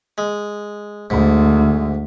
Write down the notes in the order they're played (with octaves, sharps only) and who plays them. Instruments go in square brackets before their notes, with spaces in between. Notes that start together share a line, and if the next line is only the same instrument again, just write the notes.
[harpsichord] G#3
[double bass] D2 [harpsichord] G#2